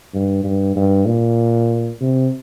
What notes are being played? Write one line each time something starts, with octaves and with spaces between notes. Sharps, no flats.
G2
G2
G2
A#2
C3